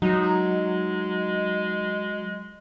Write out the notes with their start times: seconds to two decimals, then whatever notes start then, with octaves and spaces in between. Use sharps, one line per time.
0.02 F#3 G#3 D#4